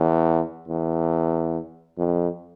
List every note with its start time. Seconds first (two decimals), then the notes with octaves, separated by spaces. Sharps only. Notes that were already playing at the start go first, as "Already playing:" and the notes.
Already playing: E2
0.68 E2
1.98 F2